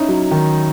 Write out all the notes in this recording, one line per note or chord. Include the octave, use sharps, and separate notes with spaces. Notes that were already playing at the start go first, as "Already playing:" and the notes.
Already playing: C#4 D#4 E4
F#3
D#3